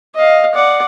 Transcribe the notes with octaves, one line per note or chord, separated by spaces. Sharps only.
D#5 F5
D5 F#5